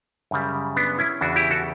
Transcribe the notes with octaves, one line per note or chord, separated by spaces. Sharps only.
F#2 C#3 G3
B3 D4
C#4 E4
E2 C#3 E3 D4 F#4
E4 G4
F#4 A4